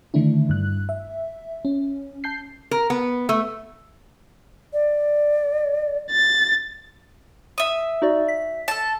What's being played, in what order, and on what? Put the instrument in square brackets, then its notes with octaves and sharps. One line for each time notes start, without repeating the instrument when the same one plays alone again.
[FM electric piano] D3 D#3 A3 D4 E4
G2 F#6
E5
C#4
A5 G6 C7
[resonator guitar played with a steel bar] A#4
B3
A3
[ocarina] D5
[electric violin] A6
[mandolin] E5 D#6
[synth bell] D#4 F#4 D5
B6
[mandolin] A4 A5